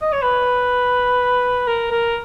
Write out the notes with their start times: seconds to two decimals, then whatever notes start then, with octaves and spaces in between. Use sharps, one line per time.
0.01 D#5
0.12 C#5
0.22 B4
1.67 A#4
1.91 A#4